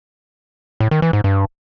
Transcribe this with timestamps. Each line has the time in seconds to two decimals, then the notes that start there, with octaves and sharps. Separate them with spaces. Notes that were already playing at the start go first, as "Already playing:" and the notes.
0.80 A2
0.91 D#3
1.02 E3
1.13 G#2
1.24 G2